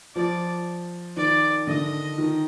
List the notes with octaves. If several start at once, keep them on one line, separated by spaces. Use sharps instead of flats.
F3 D5
D#3 D5
D3 D#5
D#3